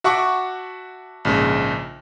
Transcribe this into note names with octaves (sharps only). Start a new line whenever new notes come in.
F#4 E5 F#5 A5 C#6 D6
A#1 G#2 C#3